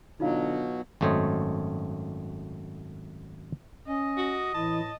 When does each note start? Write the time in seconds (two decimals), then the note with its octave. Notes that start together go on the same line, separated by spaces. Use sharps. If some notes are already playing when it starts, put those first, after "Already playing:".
0.20 B2 D3 F#3 D#4 F4 F5
1.01 G#1 F#2 A3 C5 C#5 D#5
3.88 C#4 D#5
4.17 F#4
4.54 A2 E3 E4 A5